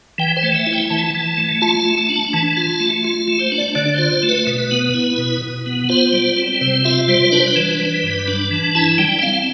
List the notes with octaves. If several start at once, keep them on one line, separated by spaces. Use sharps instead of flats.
E3 G5
C5
A3
E5
E4
G5
E3 A5
E3
A3
F4 A5
A5
A3
A5
D4
A5
E3 A5
F4 A5
A3
F4
A3
C5
D4
D5
D3 D5
D5
F4 C5
C5
A3
B4
B2
B3
E4
B2
B2
B3
F4 C5
G3
C4
C3 C5
F4 E5
G3 C5
D4 B4
C5
B4
E3
G3
G2
D4
E3
E4 A5
G3 G5
E5
C4 F5